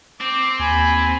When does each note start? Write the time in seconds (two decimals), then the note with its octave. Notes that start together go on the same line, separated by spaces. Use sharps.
0.21 C4 D6
0.59 D#2 G#5 B5